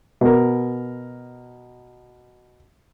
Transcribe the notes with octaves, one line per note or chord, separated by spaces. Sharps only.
B2 A#4